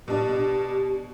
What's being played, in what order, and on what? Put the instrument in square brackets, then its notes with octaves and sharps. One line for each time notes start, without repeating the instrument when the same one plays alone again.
[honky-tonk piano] B2 D4 [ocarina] G4